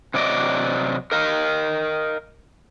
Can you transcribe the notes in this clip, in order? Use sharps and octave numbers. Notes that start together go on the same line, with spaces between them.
C3 F#3 D5 D#5
A#4 D#5 F5